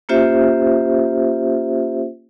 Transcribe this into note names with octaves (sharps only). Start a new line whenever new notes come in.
A#3 C#4 F4 G4 C5 E5